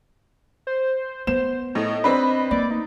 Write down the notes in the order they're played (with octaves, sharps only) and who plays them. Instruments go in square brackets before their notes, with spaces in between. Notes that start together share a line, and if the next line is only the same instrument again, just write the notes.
[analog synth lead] C5
[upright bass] B3 [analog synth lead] C5 [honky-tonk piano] E7
[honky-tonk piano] A2 [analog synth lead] D#5
[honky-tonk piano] C4 D4 B4
[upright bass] A#3 [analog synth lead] D5
[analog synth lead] D#4